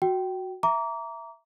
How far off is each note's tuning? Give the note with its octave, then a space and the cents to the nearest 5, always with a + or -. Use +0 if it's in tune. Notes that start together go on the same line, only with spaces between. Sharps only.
F#4 +0 G5 -20
E5 +10 A#5 +0 D6 -30